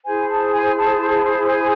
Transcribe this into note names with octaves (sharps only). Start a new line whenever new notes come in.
E4 G#4 C5 G#5
A5
G#5
A5
G#5